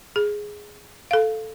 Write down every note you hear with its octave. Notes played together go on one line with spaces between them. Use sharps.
G#4
A4 F5